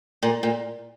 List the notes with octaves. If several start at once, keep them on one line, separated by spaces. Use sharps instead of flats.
A#2
A#2